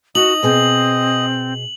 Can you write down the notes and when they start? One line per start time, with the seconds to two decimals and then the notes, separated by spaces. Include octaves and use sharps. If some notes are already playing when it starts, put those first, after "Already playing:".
0.15 D#4 F#4 D#5 F#7
0.43 B2 C4 G#4 G#5